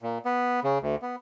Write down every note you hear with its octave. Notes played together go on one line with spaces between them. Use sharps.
A#2
B3
C#3
D2
B3